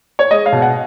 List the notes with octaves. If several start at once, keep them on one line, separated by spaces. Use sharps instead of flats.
C#5
G#3 D#5
F5
B2
F#5